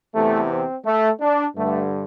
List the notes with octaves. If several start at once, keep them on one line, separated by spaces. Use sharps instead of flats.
E2 C3 E3 A3
C4
A3
D4
G2 D3 A3